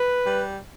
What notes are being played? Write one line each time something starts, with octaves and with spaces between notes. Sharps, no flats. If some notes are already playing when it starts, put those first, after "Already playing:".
Already playing: B4
G3